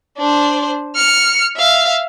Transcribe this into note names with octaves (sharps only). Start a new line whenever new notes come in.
D4 C5
F6 C#7
E5 F5